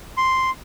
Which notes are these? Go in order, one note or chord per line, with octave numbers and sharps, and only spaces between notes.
C6